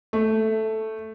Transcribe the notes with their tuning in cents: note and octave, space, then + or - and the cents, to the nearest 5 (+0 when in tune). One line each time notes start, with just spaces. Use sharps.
A3 +0